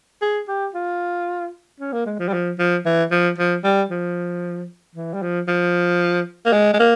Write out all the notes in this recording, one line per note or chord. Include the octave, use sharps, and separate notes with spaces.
G#4
G4
F4
C#4
A#3
G#3
F3
G3
F3
F3
E3
F3
F3
G3
F3
E3
G3
F3
F3
A#3
G#3
G#3
A#3